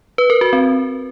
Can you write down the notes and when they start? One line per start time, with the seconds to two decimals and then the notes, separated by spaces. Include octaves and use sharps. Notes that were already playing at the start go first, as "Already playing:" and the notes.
0.18 B4
0.30 A#4
0.41 F#4
0.53 C4